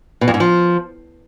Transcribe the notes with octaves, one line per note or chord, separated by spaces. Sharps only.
B2
F2
G#2
F3